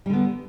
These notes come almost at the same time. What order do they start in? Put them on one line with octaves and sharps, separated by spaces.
G3 D3 B3